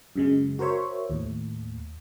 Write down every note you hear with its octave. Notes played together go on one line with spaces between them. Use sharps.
F#2 C#3 G#3
F#4 A#4 C5 C#5 E5
D#2 A2